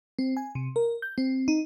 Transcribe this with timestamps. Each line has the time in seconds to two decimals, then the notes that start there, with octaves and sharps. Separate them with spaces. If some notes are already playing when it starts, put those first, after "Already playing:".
0.19 C4
0.37 G#5
0.55 C3
0.76 A#4
1.02 G6
1.18 C4
1.48 D#4